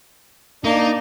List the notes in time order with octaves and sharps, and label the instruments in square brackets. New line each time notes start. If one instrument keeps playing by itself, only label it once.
[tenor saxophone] A#3 [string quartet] D4 [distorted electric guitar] D#4